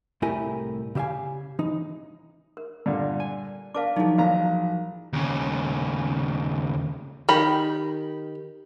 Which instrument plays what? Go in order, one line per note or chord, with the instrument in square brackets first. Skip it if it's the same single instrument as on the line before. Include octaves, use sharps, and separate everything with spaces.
[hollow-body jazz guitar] C2 A2 E4 G4 A#4 G#5
C#3 G4 E5 F5 G#5
E3 D#4
[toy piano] A#4
[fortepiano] G2 A#2 D3
[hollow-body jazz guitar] G#5
[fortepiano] D4 A#4 [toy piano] F5 A5 D6
[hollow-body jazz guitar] F3 F#3 [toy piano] D#4 E4 G#4
[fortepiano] A1 A#3 A#5 [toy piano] F5
[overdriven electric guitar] D#2 C#3
[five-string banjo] D#3 G4 B5